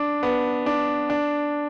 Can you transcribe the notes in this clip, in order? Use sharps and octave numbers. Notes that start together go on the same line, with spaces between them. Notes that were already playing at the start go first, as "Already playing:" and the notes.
Already playing: D4
B3
D4
D4